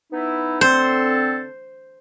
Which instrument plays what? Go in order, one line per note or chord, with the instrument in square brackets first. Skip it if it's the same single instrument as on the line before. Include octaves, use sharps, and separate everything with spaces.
[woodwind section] B3 D#4 E4
[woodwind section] D3 C4 A4 [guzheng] C5